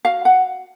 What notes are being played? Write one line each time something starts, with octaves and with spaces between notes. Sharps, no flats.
F#4 F5
F#5